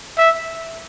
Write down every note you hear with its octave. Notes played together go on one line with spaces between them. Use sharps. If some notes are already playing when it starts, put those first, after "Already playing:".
E5